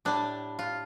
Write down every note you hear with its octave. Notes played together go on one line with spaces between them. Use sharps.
A2 G3 D4
F4